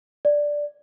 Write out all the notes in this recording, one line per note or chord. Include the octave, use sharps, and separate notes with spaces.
D5